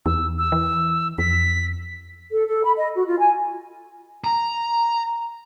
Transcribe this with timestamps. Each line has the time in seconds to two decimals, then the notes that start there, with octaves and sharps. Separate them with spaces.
0.06 E2 E6
0.38 E6
0.52 E3
1.18 F2 B6
2.32 A4
2.48 A4
2.64 B5
2.77 D#5
2.94 F#4
3.08 F4
3.20 G#5
4.24 A#5